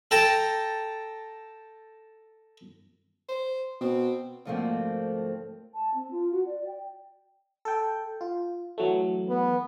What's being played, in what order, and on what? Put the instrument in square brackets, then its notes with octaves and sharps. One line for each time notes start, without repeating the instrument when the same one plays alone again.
[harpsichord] A4 G5 A5 A#5
[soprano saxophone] C5
[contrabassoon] B2 [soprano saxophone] C4
[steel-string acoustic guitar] D2 G#2 F3 A3 A#3 C4
[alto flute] A5
C4
F4
F#4
D5
G5
[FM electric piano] A4 G5
F4
E3 F#3 A3
[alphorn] B3